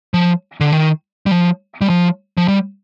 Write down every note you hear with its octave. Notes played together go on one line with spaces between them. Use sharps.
F3
D3
D#3
G3
F3
G3
F3
F3
G3